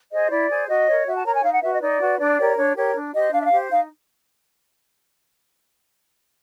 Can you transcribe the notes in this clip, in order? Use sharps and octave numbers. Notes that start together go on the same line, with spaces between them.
G#4 C5 D#5
E4 D5
G#4 C5
F#4 D#5
A#4 C#5
F#4 E5
A5
A#4 C#5 A#5
G#5
D#4 F5
F#5
F#4 B4 E5
D#5
D#4 D5
F#4 B4
D4 D5
G4 A#4 C#5
D4 C#5
G4 A#4 C#5
D4
G4 C5 D#5
D4 F5
E5
F5
G4 C5
D#4 F5